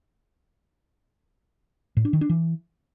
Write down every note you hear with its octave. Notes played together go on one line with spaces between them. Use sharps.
A2
D4
D#3
D4
E3